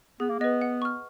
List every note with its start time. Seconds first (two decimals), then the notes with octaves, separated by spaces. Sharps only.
0.20 B3 G#4
0.30 A#3
0.39 B3 B4 D#5
0.61 F#5
0.82 C#6 F6